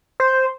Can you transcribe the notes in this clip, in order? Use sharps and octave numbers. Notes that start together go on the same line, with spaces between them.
C5